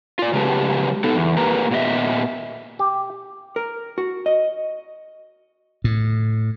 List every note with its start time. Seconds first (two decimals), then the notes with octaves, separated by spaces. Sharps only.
0.19 F4 D5
0.33 C#3 F#3 G#3 G4 B4 A5
1.04 B3 D#4 A4
1.16 E2
1.37 A#3 G4 A#4 B4 A#5
1.71 A#2 B3 D#5 E5
2.79 G4
3.56 A#4
3.98 F#4
4.26 D#5
5.84 A2